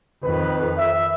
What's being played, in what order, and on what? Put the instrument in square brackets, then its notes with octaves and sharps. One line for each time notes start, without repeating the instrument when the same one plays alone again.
[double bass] F2 D#3 [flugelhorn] B4
[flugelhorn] E5